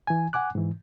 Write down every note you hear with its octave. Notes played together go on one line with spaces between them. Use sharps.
E3 G#5
F#5 G#5 D6 F#6
G#2 E3